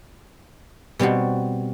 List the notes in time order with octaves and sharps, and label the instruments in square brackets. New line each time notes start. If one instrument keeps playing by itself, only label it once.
[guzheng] B2 G3 C4 F#4